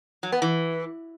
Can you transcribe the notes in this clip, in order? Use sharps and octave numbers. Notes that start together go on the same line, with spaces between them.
F#3
B3
E3